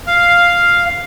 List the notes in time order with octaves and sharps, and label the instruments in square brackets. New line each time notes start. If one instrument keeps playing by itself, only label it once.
[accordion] F5